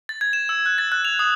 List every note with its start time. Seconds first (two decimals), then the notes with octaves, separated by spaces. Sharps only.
0.09 A6
0.21 G#6
0.33 E7
0.49 E6
0.66 F#6
0.78 A6
0.92 F#6
1.05 F7
1.19 D#6